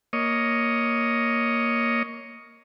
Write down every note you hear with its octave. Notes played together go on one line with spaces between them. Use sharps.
A#3 C#5 D#5